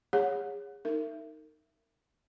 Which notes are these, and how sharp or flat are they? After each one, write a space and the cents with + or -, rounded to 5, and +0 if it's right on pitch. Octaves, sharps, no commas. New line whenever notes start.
G#4 -30 C#5 +0 F#5 -30
D#4 +0 A#4 -35 E5 +20